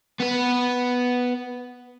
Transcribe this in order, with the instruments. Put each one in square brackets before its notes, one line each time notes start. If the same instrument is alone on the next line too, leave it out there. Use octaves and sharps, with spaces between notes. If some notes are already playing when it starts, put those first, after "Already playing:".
[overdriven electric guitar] B3 B4